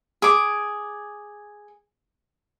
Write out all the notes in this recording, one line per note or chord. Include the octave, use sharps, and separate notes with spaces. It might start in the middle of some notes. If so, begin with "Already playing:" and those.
G#4 D6